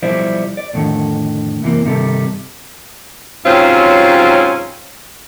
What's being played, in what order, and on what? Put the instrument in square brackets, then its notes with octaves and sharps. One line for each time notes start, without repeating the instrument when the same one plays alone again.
[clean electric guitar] B1 F3 G3 E4 C5 D5
D5
F2 A2 D3 D#3 A3
C2 F#2 C3 E3 A#3
G2 C3 D#3 G3 A4
[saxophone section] G#2 C3 F#3 C4 C#4 F4